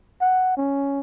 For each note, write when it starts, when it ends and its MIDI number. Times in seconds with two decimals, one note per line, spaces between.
0.21 0.52 78
0.57 1.00 61